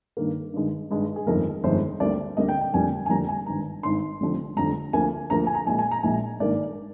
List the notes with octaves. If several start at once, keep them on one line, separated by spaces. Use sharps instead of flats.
G2 D#3 A#3
G2 D#3 G#3
G2 D#3 G#3
G#4
G1 F2 D#3 G#3 A#4
G1 F2 D#3 G#3 C5
D2 D3 G3 A#3 D5
D2 D3 G3 A#3 D#5
G5
G5
F1 F2 D3 G3 A#3 G#5
G#5
F1 F2 D3 G3 A#3 A#5
G#5
G#1 G2 D#3 A#5
G#1 G2 D#3 C6
F1 F2 D3 G3
F1 F2 D3 G3 A#5
D2 D3 F3 A#3 G#5
D2 D3 F3 A#3 A#5
G#5
A#5
A#1 A#2 G#3 G#5
G#5
A#5
A#1 A#2 G#3 G#5
G#1 G2 D#3 A#3 D5